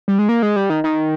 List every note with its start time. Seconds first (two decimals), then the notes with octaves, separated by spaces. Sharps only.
0.08 G3
0.19 G#3
0.29 A#3
0.43 G#3
0.56 G3
0.70 D#3
0.84 D#3